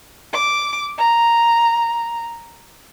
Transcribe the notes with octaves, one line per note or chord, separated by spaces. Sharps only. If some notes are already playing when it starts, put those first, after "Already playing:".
D6
A#5